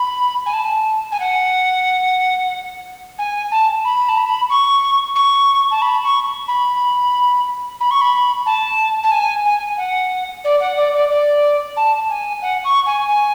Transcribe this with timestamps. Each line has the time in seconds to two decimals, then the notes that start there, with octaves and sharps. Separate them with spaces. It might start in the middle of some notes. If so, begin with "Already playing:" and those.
Already playing: B5
0.45 G#5
0.53 A5
1.11 G#5
1.20 F#5
3.18 G#5
3.51 A5
3.84 B5
4.08 A5
4.17 B5
4.49 C#6
5.15 C#6
5.70 A5
5.81 B5
6.04 C#6
6.48 B5
7.80 B5
7.90 C#6
8.01 B5
8.46 A5
9.03 A5
9.11 G#5
9.45 G#5
9.77 F#5
10.44 D5
10.60 F#5
10.76 D5
10.93 D5
11.09 D5
11.76 A5
12.09 G#5
12.42 F#5
12.64 C#6
12.86 G#5
13.07 G#5